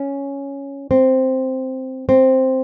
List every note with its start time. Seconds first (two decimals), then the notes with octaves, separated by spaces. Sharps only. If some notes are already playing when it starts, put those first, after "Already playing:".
Already playing: C#4
0.91 C4
2.09 C4